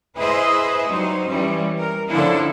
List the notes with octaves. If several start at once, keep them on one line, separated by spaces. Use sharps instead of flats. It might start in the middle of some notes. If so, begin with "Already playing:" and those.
E4 G#4 B4 C5 D#5 E5
F#3 G3 D#4 C5
E3 G3 C#4
A#4
D3 F3 C#4 D4 E4 A4